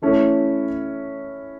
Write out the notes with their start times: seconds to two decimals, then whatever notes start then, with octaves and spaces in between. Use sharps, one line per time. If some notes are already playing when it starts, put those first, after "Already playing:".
0.02 E3 A3 C#4 E4